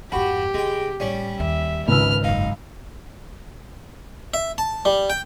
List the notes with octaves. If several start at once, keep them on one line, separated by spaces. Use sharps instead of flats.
F2 G#2 F#4 G4 B5
C#3 G#3 G5
A1 G3 C#4 C#5 D5
D#2 E5
G#1 C#2 G#3 B4 E6 F6
F#1 F#3 D#4 F5
E5
A5
G3
G5